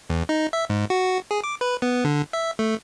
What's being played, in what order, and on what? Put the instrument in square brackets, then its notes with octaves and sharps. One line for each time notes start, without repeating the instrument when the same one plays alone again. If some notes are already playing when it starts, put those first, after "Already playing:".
[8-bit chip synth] E2
D#4
E5
G#2
F#4
G#4
D6
B4
B3
D3
E5
A3